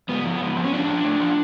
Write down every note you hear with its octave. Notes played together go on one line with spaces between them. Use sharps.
G#2 B3
F3
G#2
F3
C#4
G#2 D4
F3
A2
F3